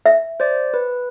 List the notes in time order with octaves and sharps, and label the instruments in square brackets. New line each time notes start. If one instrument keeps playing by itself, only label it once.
[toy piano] E5
[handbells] C5 D5
B4